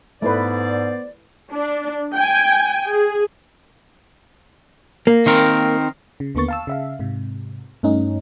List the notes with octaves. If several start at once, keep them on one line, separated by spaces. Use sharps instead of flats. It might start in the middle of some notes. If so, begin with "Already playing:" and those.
G#2 A3 B3 E4 B4 C5 D5
D4
G5 G#5
G#4
A#3
D#3 C4 A#4
C#3
D#2 D3 A#3 B3 C#6 A6
F5 A5 E6
C#3 E5 F5
G#2 C3
G2 A3 C#4 D#4